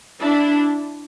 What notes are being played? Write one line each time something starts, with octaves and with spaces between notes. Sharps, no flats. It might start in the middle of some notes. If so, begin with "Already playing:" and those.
D4 E4